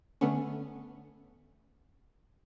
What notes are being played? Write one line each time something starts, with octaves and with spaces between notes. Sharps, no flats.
D3 A3 B3 C#4